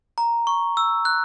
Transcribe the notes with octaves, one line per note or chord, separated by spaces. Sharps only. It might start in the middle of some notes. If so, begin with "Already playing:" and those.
A#5
C#6
E6
F#6